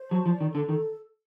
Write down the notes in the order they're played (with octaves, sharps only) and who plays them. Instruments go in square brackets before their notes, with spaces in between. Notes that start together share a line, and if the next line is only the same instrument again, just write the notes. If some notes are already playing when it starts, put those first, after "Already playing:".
Already playing: [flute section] C5
[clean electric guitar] F#3 [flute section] A5
[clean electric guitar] F3
[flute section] D5
[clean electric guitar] D#3
[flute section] A4
[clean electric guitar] D3
[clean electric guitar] D#3 [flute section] A4